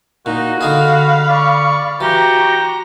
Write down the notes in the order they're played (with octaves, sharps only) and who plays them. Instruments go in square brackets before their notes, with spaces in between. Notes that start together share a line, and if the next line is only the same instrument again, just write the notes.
[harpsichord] A#2 [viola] D#4 [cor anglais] F#4
[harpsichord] D3 D#4 G#4 [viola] F5 B5
[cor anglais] D5 [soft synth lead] C#6
[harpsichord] E3 [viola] F#4 [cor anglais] G4 [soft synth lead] A#5